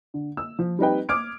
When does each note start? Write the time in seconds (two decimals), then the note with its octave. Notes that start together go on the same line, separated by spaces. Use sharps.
0.14 D3
0.37 E6
0.59 F3
0.79 G3 C4 D#4 B4 G5
1.09 D6 D#6 F6 G#6 D7